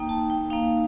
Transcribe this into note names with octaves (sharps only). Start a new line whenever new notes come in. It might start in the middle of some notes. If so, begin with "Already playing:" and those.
Already playing: A#3 D#4 G5
A5
G5
A#3 D#4 F5